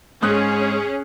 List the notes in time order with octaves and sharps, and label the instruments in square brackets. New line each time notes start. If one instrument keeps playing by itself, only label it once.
[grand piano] G#2 D#6 F#6 [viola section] C#4 G#4